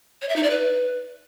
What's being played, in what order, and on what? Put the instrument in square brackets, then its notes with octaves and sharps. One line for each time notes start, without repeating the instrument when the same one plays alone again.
[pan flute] C#5
E5
D#4
D5
B4